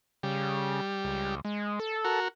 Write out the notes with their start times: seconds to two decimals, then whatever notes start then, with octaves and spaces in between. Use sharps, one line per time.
0.23 C#3 G3
1.05 C#2
1.45 G#3
1.80 A4
2.05 F#4 A#4